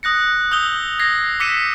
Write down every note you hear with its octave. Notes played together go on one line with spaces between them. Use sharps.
D#6 F#6 A#6 C#7
D#6 E6 G6 F7 G7
G#6 A#6 C7
D6 E6 B6 C#7 D#7 E7